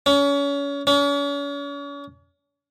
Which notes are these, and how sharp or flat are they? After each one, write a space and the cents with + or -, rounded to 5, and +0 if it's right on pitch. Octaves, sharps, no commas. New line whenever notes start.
C#4 +30
C#4 +40